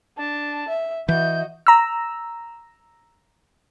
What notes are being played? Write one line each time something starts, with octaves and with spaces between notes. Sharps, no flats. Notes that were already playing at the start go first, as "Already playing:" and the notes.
D4 A5
E5
E3 F#4 D#5 E5 G6
A#5 E6